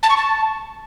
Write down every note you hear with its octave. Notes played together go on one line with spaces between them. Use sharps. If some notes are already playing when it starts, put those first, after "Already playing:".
A5
C#6
A5